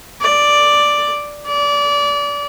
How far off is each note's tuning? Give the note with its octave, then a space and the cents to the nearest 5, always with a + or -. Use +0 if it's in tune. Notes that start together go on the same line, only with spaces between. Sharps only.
D5 +0
D5 -25